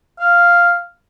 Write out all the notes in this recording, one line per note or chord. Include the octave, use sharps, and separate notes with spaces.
F5